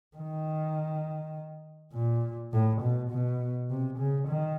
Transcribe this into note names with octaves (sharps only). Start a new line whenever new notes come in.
D#3
A#2
A2
B2
B2
C3
C#3
D#3